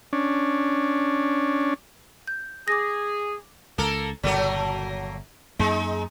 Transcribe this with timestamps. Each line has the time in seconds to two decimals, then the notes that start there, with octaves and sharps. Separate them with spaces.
0.13 C#4 D4
2.27 G6
2.68 G#4 D6 A#6
3.78 C#2 A#3 A4 A#4
4.23 G1 A#2 C#3 F#3 A3 A#3
5.59 F#2 G#3 A#3 D#4